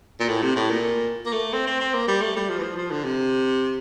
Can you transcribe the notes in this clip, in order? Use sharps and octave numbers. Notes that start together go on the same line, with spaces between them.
A#2
A2
C3
A2
A#2
A#3
A3
C4
C4
C4
A#3
G3
A3
G3
F3
E3
F3
F3
D3
C3